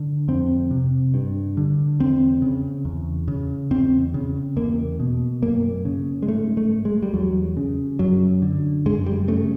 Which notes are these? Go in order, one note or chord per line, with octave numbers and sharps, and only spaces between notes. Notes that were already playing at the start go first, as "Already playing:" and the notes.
Already playing: D3
F2 C4
C3
G2
D3
E2 C4
C#3
E2
C#3
E2 C4
C#3
E2 A#3
B2
F#2 A#3
C#3
G#3
G#2 A3
A3
G#3
G3
E2 F#3
C#3
F#2 F#3
D3
F#2 G#3
G3
C#3 A3